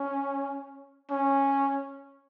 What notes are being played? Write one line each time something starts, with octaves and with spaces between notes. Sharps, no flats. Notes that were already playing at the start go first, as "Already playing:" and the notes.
Already playing: C#4
C#4